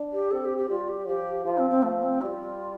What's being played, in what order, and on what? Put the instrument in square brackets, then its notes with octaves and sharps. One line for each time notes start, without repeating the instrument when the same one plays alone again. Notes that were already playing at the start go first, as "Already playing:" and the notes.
Already playing: [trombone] D4
[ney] G4
[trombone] C4 [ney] A4
[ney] G4
G4
[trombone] G3 [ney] F4
[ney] G4
[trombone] F3 [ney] G4
[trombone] F3 [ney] F4
[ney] C4
C4
[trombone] F3 [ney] A3
[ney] C4
[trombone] G3 [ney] F4 G4